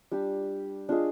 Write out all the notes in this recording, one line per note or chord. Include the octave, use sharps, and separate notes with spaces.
G3 D4 G4
D4 F4 G#4 D#5